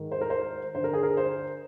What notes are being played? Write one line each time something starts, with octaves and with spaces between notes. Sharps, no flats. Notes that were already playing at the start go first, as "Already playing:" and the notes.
Already playing: G#2 D#3
C5
A#4
C5
G2 D3 C5
A#4
G#4
A#4
C5